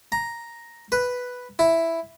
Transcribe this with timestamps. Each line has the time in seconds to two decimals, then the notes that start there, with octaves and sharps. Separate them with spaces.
0.12 A#5
0.92 B4
1.59 E4